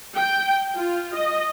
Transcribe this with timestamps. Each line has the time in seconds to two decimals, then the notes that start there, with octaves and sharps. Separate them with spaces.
0.16 G5
0.74 F4
1.13 D#5